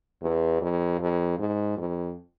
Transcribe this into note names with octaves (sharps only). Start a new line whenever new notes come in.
E2
F2
F2
G#2
F2